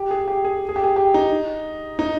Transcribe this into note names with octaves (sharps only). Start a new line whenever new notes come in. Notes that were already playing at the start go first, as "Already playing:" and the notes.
Already playing: G4
G#4
G4
G#4
G#4
G4
G#4
G4
D#4
D#4